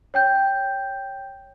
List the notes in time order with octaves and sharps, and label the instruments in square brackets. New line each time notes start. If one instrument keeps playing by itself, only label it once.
[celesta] C#5 G5 G6